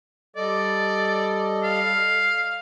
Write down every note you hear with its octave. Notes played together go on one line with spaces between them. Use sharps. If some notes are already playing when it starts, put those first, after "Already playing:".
G3 A4 D5 D#5
F5